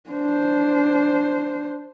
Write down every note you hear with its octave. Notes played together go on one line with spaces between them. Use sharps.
D4 C5